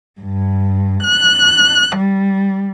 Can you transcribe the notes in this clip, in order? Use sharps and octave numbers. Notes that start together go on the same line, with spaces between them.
G2
F#6
G3